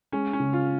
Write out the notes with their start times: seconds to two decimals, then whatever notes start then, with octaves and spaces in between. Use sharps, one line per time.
0.12 G#3 C#4
0.33 C#4
0.40 C#3
0.53 F4